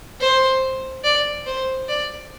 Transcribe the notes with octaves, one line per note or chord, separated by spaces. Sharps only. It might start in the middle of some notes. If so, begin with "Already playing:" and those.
C5
D5
C5
D5